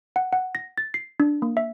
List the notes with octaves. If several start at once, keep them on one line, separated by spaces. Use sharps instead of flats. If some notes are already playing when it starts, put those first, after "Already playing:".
F#5
F#5
A#6
A6
C7
D4
A#3
E5